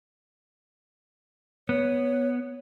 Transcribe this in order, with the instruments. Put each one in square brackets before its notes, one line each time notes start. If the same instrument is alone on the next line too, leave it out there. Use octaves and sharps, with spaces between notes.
[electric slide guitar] B3 [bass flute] C#5